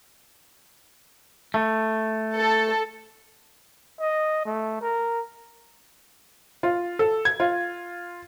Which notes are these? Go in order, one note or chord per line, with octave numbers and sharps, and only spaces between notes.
A3
A4
D#5
A3
A#4
F4
A4
G#6
F4